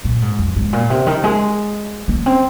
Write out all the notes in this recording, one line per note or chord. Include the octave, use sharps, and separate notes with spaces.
A#2
G#2
F2
G#2
A#2
C3
D#3
G#3
A#3
C4